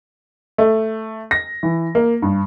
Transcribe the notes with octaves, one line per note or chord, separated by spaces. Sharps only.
A3
A#6
E3
A#3
G2